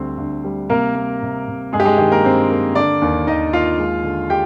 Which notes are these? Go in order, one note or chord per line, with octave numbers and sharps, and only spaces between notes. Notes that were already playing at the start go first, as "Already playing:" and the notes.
Already playing: D2 G3 C4 C5
D2
G3
C3 A#3 A#4
A#3
C3
C3
G2 G#3 G#4
G4
G#3 G#4
D#3 G4
A#3 A#4
G2 C4 C5
A#3
D3 D4 D5
D#2
D#2 D#4 D#5
D#2 F4 F5
G#3
D3
G#3 G4 G5